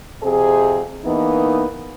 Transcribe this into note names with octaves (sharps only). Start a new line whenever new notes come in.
F2 C3 C4 G#4
E3 A#3 B3 D#4